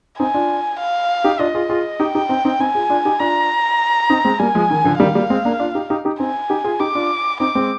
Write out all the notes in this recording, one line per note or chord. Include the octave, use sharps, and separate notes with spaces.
C4 D#4 G#5
D4 F4
F5
D#4 G4
D4 F4 D#5
F4 G#4
F4 G#4
D#4 G4 G5
D#4 G4
C4 D#4
C4 D#4
C4 D#4 G#5
F4 G#4
D4 F4
D#4 G4
D4 F4 A#5
C4 D#4
G#3 C4
G3 A#3 G#5
F3 G#3
D#3
D3 F3
D#3 G3 F5
G3 A#3
G#3 C4
A#3 D4
D4 F4
D#4 G4
D#4 G4
D#4 G4
C4 D#4 G#5
D#4 G4
F4 G#4
D#4 G4 D6
D4 F4
C4 D#4 D6
G#3 C4